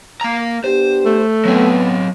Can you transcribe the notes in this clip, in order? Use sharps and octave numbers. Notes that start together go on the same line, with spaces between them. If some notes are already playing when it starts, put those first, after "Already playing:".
A#3 A#5
B3 D4 G4 C5
A3
F#3 B3 C4